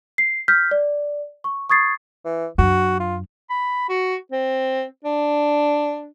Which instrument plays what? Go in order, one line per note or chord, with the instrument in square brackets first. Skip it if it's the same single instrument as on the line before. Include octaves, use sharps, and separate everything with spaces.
[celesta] C7
F6 G6 B6
D5
C#6
C#6 D#6 G#6 A6 C7
[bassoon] E3
[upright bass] F#2 D4 [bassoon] F#4
[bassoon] F4
[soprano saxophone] B5
F#4
C4
D4